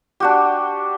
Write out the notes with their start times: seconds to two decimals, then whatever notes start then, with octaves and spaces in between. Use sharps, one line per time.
0.20 D4 F#4 G4